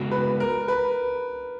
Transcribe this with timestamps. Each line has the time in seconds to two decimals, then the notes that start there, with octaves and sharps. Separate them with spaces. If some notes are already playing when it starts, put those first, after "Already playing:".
Already playing: C#3 G#3 B3 F#4
0.11 B4
0.40 A#4
0.68 B4